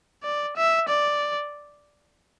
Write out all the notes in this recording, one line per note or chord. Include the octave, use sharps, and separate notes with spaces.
D5
E5
D5